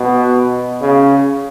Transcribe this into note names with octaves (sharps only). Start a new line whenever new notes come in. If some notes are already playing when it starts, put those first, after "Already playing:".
Already playing: B2
C#3